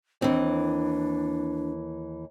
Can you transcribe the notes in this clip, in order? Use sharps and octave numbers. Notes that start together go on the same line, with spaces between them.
D#2 E3 C4 D4